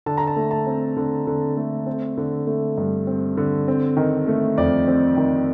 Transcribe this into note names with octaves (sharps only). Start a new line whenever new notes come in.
D3 A5
A#5
A5
A3
A5
C4
D3
D3
A3
C4
D3
A3
G2
C4
D3
C4
D#3
A3
F2 D5
C4
D#3